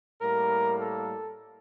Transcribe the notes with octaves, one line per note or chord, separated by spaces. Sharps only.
A2 G3 A#3 A#4
A4